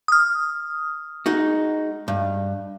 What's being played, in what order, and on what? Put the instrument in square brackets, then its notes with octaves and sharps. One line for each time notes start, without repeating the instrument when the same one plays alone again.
[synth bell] D#6 F6
[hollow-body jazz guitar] G#3 D#4 F#4
G2